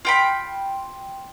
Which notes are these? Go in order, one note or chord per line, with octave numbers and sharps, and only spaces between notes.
F4 G5 B5